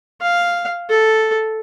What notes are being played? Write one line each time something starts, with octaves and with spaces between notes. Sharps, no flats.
F5
A4